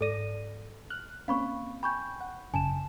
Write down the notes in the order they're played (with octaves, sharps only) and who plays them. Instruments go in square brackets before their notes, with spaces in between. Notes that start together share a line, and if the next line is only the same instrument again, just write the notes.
[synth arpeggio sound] G#2 D5 A#6 [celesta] A4 D#7
[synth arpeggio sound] F6 F#6
[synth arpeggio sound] A#3 C4 C#4 [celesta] F5 B5 C#6
[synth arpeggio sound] G5 G#5 [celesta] B5 C#6 G6
[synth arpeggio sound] F#5
[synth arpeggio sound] G#1 F#2 C#3 [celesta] G#5 A5 E7